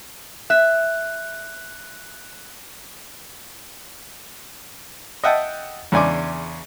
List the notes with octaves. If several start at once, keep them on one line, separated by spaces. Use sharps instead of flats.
E5 F#6
D#5 E5 F#5 G5 A5
E2 C#3 D4 G#5 C6 D6